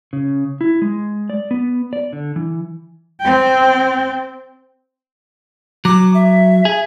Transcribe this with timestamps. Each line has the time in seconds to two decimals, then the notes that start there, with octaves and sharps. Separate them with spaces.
0.13 C#3
0.61 E4
0.82 G#3
1.30 D5
1.51 B3
1.93 D5
2.13 D3
2.36 E3
3.21 C4 G5
5.85 F#3 D6
6.14 E5
6.65 G#4